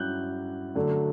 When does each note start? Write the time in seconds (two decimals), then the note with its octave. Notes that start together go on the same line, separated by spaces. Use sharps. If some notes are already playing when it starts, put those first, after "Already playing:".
Already playing: G2 F#3 C#4 E4 F#6 G6
0.75 D3 F#3 A3 D4